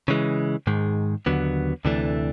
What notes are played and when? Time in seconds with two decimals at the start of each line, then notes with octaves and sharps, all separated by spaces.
0.08 C#3 E3 G#3
0.67 G#2 D#3 G#3
1.26 D#2 D3 F#3 B3
1.85 D2 C3 E3 A3 D4